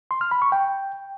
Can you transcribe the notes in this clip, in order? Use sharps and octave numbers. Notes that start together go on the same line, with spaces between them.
C6
F6
B5
C#6
G5